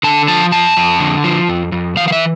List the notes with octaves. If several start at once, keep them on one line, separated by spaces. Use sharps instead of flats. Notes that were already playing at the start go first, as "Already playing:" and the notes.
D3 A5
F3 A5
F2 A5
F2
D3
F3
F2
F2
E3 F5
F5
E5